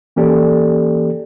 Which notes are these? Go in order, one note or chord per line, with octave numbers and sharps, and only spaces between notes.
E3 A#3 C#4 G4 A4 D5